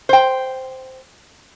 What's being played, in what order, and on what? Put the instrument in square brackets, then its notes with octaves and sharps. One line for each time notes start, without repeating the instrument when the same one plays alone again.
[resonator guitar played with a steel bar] C5 G5